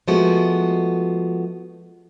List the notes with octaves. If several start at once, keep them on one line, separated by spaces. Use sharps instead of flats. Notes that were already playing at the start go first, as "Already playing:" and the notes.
F3 G#3 A3 B3 F#4